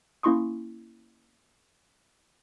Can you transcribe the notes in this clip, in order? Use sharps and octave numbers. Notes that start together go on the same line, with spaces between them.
A#3 C#4 E4 C6 C#6 D#6